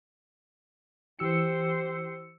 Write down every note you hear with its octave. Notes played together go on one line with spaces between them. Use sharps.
E3 G4 C5 E6 C#7